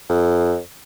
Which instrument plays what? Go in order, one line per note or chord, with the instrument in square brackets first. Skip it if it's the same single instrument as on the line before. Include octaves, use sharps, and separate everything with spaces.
[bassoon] F2